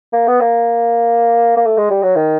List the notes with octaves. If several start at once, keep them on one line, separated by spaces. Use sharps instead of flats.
A#3
B3
A#3
A#3
A3
G#3
G3
F#3
D#3